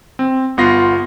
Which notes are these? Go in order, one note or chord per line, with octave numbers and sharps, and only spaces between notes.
C4
G1 B3 F4 A#6 C7